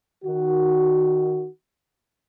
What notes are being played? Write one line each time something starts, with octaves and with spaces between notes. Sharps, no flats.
D#3 F#4